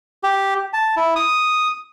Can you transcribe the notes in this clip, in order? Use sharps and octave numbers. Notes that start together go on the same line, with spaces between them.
G4
A5
E4
D#6